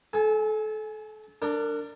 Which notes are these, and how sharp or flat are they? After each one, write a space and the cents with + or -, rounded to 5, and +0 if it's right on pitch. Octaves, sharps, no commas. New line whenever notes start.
A4 -30 G#5 +15
D4 +0 A#4 -35